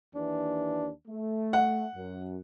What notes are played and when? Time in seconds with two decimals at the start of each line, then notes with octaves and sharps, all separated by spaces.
0.15 D#2 E3 D4
1.08 A3
1.53 F#5
1.96 F#2